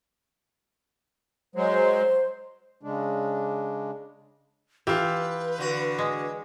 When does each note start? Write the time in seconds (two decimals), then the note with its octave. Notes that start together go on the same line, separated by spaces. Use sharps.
1.56 F#3 G#3 C5
2.83 C#3 G#3 D4
4.87 E3 F4 G4 B4
5.58 D3 F#4
5.98 G#3